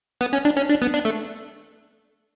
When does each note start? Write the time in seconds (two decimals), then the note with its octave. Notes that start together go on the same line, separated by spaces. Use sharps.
0.21 B3
0.33 C#4
0.45 D4
0.57 C#4
0.69 D4
0.82 B3
0.94 D4
1.05 A3